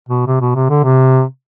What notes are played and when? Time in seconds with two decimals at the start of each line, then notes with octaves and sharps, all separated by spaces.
0.09 B2
0.27 C3
0.41 B2
0.55 C3
0.70 D3
0.84 C3